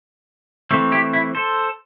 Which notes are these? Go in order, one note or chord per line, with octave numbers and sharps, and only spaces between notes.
E3 A3 C4
E4 G4
E4
A4 C5